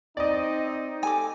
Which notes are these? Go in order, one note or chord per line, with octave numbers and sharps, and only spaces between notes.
C4 D#4 D5 D#5
G4 A4 G#5 D6